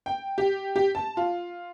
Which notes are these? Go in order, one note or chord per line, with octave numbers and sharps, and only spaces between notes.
G5
G4
G4
A5
F4